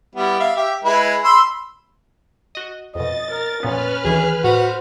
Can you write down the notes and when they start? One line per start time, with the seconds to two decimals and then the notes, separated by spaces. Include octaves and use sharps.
0.15 G3 B3 E4
0.40 E5 F5
0.57 G4 E5
0.84 G#3 E4 B4
1.24 B5 C6 E6
2.55 F#4 D#5
2.95 F2 B2 D#5 A6
3.31 A#4
3.63 F2 A#2 B3 C#4 B4 F6
4.05 D2 D#3 E3 G#4
4.44 A2 F#4 C5